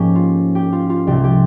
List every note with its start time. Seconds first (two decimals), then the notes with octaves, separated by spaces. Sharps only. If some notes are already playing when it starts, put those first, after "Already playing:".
Already playing: G#2 F3 A#3 C#4 G4
0.15 F4
0.55 G4
0.72 F4
0.90 F4
1.07 C2 C3 F3 G#3 C4 G4
1.24 G4